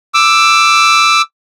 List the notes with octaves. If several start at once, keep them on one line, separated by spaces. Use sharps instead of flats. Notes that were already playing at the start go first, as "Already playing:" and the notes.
D6 E6